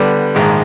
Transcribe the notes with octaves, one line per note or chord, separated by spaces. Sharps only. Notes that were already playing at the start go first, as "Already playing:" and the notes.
Already playing: D3 G3 B3
A#1 G#2 D#3 G#3